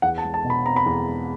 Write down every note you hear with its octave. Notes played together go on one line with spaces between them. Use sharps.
E2 F#5
A5
G#3
A5
B2
B5
C4 A#5
B5
E2 A#5
G#3